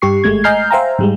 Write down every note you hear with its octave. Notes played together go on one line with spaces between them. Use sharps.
G2 G4 C#6 C7
G#1 G#3 A3 G#6
D#5 G#5 A#5 F6 G6 C7
C5 E5 F5 G5 G#5 A#5
G#2 G3 G#3